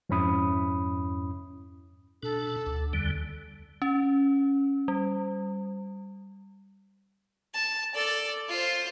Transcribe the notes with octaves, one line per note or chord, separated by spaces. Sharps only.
F2 G#2 C#4 E4 B5 D#6
B2 D4 A4
D2
E2 D3 G3
C#4
G3
A5
A4 D5
F4 C5